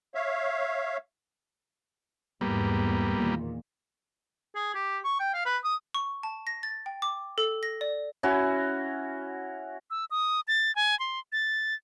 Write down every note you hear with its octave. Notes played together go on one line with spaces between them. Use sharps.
C#5 E5 F5
E2 G#2 G3 A#3 B3
E2 A#2 D#3
G#4
G4
C#6
G5
F5
B4
D#6
C#6
A5
A#6
A6
G5
D6
A4
A#6
D5
C#4 E4 F#4
E6
D#6
A6
G#5
C6
A6